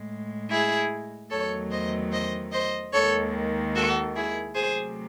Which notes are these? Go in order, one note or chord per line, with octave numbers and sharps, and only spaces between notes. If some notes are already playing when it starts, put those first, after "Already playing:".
Already playing: A2 G#3
E4 G#4
E2 D#3 F#3 A3 A4 C#5
C5 D#5
C5 D#5
C5 D#5
D#2 D#3 G#3 A4 C#5
F#4 A4
E4 G#4
C3 F#3 A3 G#4 C5